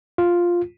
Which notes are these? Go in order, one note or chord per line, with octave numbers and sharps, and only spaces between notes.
F4